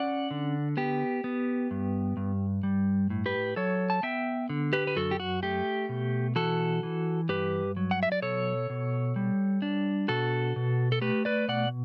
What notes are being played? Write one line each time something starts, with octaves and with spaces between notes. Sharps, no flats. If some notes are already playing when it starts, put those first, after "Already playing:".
Already playing: C#4 D5 F#5
D3
B3 G4
B3
G2
G2
G3
A2
G4 B4
F#3 A4 C#5
A5
B3 E5 G5
D3
G4 B4
B4
F#2 F#4 A4
G4
F#4
A3 G4
B2
E3 F#4 A4
E3
G2 G4 B4
F#3
F#5
E5
D5
B2 A4 C#5
B2
G3
D4
B2 F#4 A4
B2
A4
A3 G4 B4
B4 D5
B2 D5 F#5